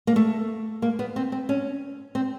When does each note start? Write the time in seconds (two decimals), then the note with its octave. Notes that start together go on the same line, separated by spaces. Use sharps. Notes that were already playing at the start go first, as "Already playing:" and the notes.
0.07 A#3
0.16 A3
0.82 A#3
0.99 B3
1.16 C4
1.32 C4
1.49 C#4
2.15 C4